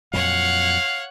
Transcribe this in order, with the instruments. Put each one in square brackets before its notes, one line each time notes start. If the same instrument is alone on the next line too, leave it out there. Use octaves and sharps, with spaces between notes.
[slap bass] F2 A#2 F#3 [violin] C#5 F#5 [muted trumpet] F5